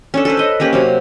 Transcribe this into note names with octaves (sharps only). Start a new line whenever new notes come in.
C#4 D4 A4
A4 B4 C5
B4 D#5
A#3 C#4 G4 B4
C3 F#3 C4